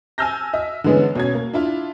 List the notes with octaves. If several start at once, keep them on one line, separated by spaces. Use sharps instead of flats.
G#5 A5 E6 F6 G6 A#6
D#5 E5
D3 E3 G#3 B3 C#4
B2 C#4 G#6
A#3
D4 E4 F4